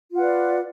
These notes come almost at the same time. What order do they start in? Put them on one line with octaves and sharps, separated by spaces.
F4 F#5 B4 D5